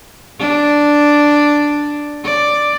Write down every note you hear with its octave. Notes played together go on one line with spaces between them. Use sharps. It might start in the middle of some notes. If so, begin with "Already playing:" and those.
D4
D5